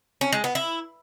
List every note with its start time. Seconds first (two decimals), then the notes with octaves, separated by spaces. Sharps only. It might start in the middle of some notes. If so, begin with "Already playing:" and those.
0.21 C#4
0.33 G#3
0.44 B3
0.55 E4